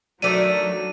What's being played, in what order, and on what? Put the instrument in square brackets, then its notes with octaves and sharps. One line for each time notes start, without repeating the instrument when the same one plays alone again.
[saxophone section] D#3 A3 [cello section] F#3 [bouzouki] D4 D5 [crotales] D#7